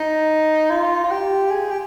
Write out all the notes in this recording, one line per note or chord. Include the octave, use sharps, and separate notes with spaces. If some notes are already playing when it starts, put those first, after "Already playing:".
Already playing: D#4
F4
F4
G4
G#4
G4